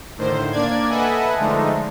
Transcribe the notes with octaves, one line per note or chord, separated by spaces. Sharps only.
A2 D3 D#3 C5
A#3 D4 D5 G#6
A4 B4 D#5 E5 F#5 G#5
D3 F3 G#3 A3 D4 D#4